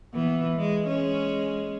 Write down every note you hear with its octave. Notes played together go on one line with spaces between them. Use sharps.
E3 B3
G#3
G#3 C#4